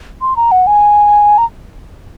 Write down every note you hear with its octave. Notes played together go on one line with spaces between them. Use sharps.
C6
A#5
F#5
G#5
A#5